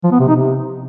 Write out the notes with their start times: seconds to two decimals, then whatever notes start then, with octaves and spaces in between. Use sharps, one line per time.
0.04 F3
0.12 B3
0.20 C3
0.28 D#4
0.36 C3